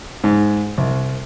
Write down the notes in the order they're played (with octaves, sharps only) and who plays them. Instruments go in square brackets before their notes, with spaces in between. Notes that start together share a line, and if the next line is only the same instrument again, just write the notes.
[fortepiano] G#2
C2